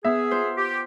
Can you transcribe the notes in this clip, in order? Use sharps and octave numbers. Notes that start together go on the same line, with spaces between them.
B3 G#4 E5
F4 C5
G4